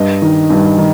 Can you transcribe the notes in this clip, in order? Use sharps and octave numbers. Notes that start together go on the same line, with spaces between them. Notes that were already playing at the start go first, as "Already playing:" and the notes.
Already playing: G2 D#5
D#3
G2
D#3